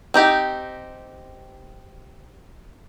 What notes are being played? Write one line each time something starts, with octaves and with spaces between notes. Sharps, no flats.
C4 D#4 G4